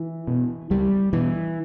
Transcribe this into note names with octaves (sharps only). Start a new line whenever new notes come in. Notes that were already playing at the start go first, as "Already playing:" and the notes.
Already playing: E3
B2
C#2 G3
B2 E3